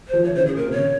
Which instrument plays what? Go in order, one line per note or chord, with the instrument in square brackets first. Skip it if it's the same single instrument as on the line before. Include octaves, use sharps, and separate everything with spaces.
[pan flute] C5
[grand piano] F3
[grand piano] E3 [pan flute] C#5
[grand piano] C#3 [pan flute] C5
[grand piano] C#3 [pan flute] G#4
[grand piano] A#2 [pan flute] A#4
[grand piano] C3
[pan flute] C#5
[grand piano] C#3